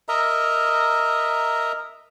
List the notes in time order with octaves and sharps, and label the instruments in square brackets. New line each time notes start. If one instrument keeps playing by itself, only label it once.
[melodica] A#4 D#5 E5 A#5